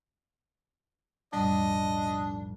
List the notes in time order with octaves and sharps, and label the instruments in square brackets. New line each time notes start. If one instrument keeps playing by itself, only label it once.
[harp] B1 F2 A2 [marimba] G3 [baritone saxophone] D4 [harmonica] D#5